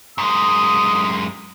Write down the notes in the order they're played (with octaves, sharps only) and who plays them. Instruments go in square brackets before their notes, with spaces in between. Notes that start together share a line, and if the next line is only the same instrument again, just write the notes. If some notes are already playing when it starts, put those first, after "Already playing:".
[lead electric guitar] F#2 G#3 [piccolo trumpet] D#6